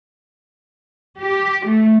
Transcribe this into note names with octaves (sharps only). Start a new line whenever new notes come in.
G4
A3